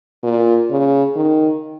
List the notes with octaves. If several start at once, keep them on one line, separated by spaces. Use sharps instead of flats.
A#2
C#3
D#3